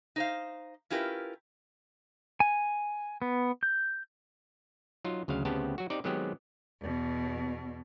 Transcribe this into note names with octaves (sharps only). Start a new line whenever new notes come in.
D#4 C5 F5
C#4 E4 F4 G4 A#4 B4
G#5
B3
G6
F#3 D#4 F4
D2 C#3 F#3 F5
D2 C#3 B3 C4 G4 A5
F#3 F#4
C4 D#4 G4 D5
D#3 F#3 G#3 B3 C4 G4
E2 B2